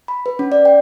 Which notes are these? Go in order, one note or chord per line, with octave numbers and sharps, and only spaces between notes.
B5
B4
C#4
D5
G5